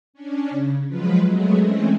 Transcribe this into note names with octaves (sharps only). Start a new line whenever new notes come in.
C#4 D4
C#3
F3 F#3 G#3 F4 B4
F#3 G#3 A3 B3 G#4
E3 G#3 A3 C4 C#4